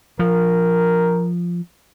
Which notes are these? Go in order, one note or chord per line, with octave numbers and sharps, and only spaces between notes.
F3 A#4